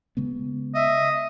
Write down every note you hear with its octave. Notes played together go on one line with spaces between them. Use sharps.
C#3 G#3 B3
D#5 E5